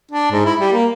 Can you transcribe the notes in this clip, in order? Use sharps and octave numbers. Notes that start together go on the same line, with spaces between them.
D4
G#2
E4
G3
A#3